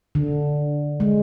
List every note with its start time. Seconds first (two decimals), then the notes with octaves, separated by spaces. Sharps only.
0.15 D3
1.00 G#3